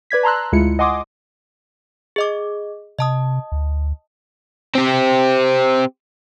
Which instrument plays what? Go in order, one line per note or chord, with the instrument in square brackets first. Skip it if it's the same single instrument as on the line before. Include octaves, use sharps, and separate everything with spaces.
[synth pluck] B4 D5 G#6 B6
A5 A#5 C6 E6 F#6
D2 G#3 E4 F4 C#7
D#5 F#5 G#5 C6 D6 D#6
[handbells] G#4 D#5 D6
[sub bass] C3 [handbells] D#5 A5 D#6
[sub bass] D2
[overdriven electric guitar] C4 G4